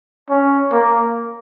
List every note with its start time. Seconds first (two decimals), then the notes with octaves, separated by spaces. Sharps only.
0.30 C#4
0.71 A#3